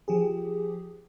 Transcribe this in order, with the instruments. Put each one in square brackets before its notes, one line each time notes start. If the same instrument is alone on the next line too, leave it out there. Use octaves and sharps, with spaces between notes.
[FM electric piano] F3 G4 G#4